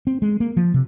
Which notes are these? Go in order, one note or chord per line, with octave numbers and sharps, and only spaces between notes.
C4
G#3
A#3
F3
C3